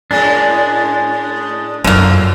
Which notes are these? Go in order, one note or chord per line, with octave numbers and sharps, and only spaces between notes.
A2 G#3 C#4 D4
F#2 D3 F#3 A#3 C4 F4